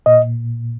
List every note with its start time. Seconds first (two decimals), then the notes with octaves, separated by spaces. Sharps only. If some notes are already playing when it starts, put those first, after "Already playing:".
0.06 A#2 D#5